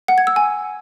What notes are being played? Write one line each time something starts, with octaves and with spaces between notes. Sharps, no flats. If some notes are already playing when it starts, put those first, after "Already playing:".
F#5
G#6
E6
G#5